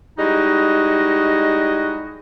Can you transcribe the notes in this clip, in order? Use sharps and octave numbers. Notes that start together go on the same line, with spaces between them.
G3 G#3 D#4 E4 F#4 D#5